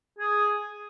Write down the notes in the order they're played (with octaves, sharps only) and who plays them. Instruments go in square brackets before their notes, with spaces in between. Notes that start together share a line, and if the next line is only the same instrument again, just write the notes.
[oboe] G#4